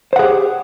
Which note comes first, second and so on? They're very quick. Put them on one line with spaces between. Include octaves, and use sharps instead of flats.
C5 F#5 G#4 G4